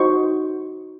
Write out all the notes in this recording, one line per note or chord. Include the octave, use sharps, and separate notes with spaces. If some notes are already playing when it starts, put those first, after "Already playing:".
Already playing: D#4 F#4 C5 C#6